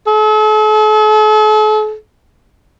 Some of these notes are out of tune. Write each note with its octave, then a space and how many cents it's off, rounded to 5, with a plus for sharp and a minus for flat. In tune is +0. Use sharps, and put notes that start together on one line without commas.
A4 -45